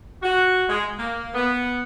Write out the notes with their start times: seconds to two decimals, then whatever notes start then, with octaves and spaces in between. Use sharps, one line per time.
0.23 F#4
0.68 G#3
0.97 A#3
1.34 B3